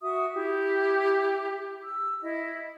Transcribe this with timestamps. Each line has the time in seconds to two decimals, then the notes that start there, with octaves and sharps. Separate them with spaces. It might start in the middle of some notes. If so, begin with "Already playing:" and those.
0.01 F#4 E5 D#6
0.35 E4 G4
1.83 E6
2.22 E4 D#5